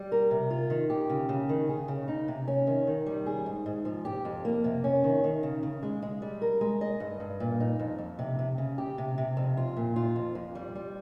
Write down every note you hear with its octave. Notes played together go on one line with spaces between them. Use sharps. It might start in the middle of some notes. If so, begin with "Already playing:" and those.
Already playing: G3
A#4
C3
F4
D#3
G4
C#3
C#3
D#3
G#4
C#3
D#4
C3
C#4
D#3
D#3
G3
G#4
G#2
G#2
F3
G4
F2
A#3
C3
C#4
D#3
D#3
C#3
C#3
G#3
G#3
G3
A#4
G#3
D#5
G2
G2
A#2
D#4
F2
F2
C3
C3
C#3
G4
C3
C3
F2
F4
A#2
F4
F2
F2
G3
G3